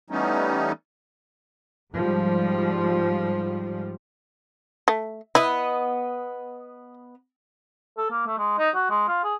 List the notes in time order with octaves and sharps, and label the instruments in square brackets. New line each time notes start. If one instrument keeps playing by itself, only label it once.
[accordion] E3 G3 A3 B3 C#4 D#4
[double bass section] G#2 F3 G3
[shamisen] A3
[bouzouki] B3 B4 D#5 [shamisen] E4
[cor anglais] A4
A#3
A3
G#3
D#4
F#4
G#3
F4
G#4